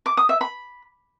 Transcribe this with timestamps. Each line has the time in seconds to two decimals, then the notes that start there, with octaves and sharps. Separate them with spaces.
0.06 D6
0.17 D#6
0.29 E5
0.41 B5